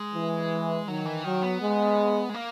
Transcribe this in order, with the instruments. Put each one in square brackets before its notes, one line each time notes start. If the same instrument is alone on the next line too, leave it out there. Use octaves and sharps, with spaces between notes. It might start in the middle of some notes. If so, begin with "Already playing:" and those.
Already playing: [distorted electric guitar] G#3
[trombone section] E3
[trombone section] D#3 [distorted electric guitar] F#3
[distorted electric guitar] E3
[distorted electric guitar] D#3 [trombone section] F#3
[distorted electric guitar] B3
[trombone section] G#3
[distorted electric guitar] G#3
A#3